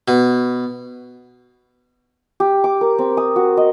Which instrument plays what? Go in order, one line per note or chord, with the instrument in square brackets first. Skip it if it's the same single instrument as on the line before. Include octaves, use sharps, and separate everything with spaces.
[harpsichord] B2
[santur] G4
D6
A#4
C4
D#6
F#4
D#5